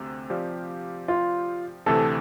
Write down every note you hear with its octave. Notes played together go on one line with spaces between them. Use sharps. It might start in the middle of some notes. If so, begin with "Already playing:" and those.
Already playing: D2 C3
F3 C4 G4 D5 F5
F4
D2 C3 E3 A3 A4